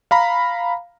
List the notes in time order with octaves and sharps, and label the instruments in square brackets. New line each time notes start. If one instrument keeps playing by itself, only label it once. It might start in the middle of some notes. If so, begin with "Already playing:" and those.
[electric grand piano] F5 A#5 B5